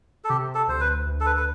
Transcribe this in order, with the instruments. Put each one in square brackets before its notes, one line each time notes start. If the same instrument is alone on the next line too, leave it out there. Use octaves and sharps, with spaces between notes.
[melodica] A4
[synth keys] C3 [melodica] G4
[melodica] A4
[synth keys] D2 [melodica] C5
[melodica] B4
[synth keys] D2
[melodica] A4
B4
B4